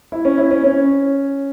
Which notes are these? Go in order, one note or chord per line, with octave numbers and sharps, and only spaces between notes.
E4
C#4
E4
C#4
C#4